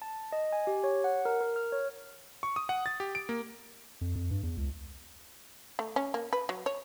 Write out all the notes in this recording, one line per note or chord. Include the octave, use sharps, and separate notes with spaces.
A5
D#5
G#5
G4
C#5
F#5
A#4
A#4
F6
C#5
C#6
D#6
F#5
A6
G4
D7
A#3
F2
F2
G2
E2
C#2
A3
C#4
A#3
B4
F#3
C#5